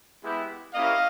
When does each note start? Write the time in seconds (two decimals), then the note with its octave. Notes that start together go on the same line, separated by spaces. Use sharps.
0.23 G#3 B3 E4 G4
0.74 A#3 C#4 E4 G4 D#5 F5